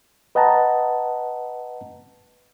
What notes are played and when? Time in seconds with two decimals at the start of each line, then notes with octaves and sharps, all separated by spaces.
0.35 B4 D#5 F#5 G5 A5 A#5